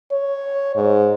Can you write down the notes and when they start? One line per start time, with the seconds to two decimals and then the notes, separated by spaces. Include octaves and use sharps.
0.11 C#5
0.76 G#2